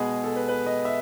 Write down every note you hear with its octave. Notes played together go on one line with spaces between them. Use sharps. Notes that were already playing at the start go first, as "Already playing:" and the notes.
Already playing: B2 G#3 B3 G#4
A4
B4
B4
D#5
E5